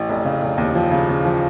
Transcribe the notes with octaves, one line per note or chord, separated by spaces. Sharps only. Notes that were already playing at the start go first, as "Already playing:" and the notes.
Already playing: A1
F1
C#3
F1
D#2
F3
C#3
C#3
F3